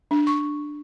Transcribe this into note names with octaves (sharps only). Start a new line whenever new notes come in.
D4
C#6